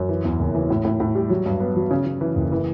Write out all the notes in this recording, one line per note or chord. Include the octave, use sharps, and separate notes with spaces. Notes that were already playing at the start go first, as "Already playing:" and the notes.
Already playing: F#2
E3
E2
F#1
E3
A2
A2
A2
G3
F#3
G2
B3
F#3
C#3
C#3
E3
F#1
E3